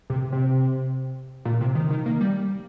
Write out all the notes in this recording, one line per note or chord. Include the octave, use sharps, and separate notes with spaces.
C3
C3
A#2
C3
D#3
D#3
A#3
G3